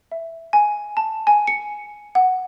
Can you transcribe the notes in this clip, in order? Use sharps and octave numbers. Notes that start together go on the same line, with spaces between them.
E5
G#5
A5
G#5
C#7
F#5